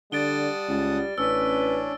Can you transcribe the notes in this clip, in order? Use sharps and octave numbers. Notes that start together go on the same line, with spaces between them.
D3 G3 F#5 A5 D#6 A6 D7 G7
C#2
A1 C#4 D4 B4 E6